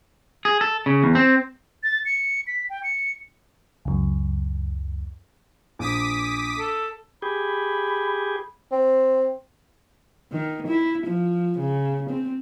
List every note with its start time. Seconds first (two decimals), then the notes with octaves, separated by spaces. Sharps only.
0.45 G#4
0.61 A4
0.86 C#3
1.03 E2
1.15 C4
1.83 A6
2.06 C#7
2.47 B6
2.70 G5
2.83 C#7
3.85 C#2 F#2
5.79 A#1 D6 D#6 B6
6.58 A4
7.22 G4 G#4 B5
8.72 C4
10.32 D#3
10.67 E4
11.06 F3
11.59 C#3
12.10 C4